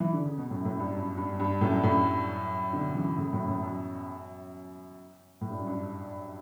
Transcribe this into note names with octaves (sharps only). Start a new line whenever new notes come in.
E3
D3
C#3
B2
F#2 A2
F#2 A2
G2
F#2
G2
G2
F#2 A2
F#2 A2
B2 D3
C#3 E3
A2 C#3
F#2 A2
F#2 A2
F#2
A2
G2
F#2
G2